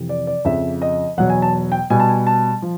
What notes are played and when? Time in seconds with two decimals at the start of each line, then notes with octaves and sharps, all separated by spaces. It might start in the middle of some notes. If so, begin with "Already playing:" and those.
Already playing: F2 C3 E3
0.09 D5
0.27 D5
0.45 F2 C#3 F3 E5
0.82 D#5
1.17 E2 B2 F#3 F#5
1.30 G#5
1.42 A5
1.72 G5
1.90 B2 G3 G#5
2.00 A5
2.09 G#5
2.27 A5
2.62 F3